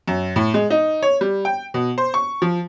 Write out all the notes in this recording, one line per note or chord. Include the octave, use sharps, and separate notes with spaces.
F#2
A2
G#3
D#4
C#5
G3
G5
B2
C5
C#6
F3